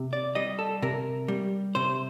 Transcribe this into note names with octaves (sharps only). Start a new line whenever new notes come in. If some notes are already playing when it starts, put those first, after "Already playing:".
Already playing: C3
D5
G3 D#5
A4
C3 A#4
G3
C3 C5